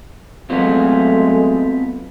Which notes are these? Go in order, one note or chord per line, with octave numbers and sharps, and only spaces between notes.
F#3 G#3 A3 B3 C4 F4